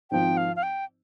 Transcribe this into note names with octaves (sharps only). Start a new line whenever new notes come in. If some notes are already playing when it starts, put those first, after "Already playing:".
G#1 G#2 F3 C4 G5
F5
F5
G5